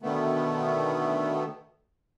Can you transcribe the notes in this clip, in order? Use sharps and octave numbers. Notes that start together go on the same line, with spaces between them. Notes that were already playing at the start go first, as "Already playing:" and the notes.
B2 D3 D#3 A3 B3